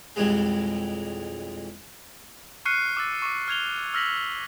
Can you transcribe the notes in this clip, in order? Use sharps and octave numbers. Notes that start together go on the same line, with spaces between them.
B1 F2 E3 G3 G#3
C#6 F6 F#6 C7 C#7 D#7
D6 E6 A6
C#6 D6
F6 G#6 F7 G7
E6 F6 A#6 B6 F#7